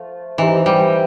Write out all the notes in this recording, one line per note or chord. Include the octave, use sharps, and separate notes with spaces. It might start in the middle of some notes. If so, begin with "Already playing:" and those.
Already playing: F3 A3 F4
E3 C4 D#4 G4 C5
G3